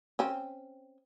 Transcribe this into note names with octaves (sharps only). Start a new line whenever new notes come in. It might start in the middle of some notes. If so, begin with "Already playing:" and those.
C4 C#4